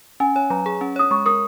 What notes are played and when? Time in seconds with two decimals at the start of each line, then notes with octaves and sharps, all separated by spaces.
0.20 C#4 G#5
0.35 C#5 G#5
0.50 F#3 A#5
0.66 G#4
0.81 C#4
0.96 C#5 D#6
1.11 G#3 C#6
1.26 A#4 D#6